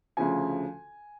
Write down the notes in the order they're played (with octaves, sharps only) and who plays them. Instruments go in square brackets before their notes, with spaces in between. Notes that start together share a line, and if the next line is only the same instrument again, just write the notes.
[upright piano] D2 C#3 F3 G#5